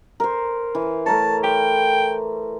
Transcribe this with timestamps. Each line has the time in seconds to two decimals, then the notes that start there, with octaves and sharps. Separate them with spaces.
0.20 A#4 C5
0.75 E3
1.06 A3 A#4 C#5 A5
1.44 C5 G5